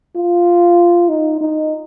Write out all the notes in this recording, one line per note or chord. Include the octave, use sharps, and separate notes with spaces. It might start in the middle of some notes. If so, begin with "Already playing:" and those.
F4
D#4
D#4